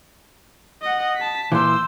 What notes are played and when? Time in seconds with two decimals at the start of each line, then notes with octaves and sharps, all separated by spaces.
0.82 D#5 F#5
1.17 A5 B6
1.52 A#2 E3 C5 C6 D6 E6